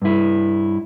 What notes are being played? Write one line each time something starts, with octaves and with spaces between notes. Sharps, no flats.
G2 E4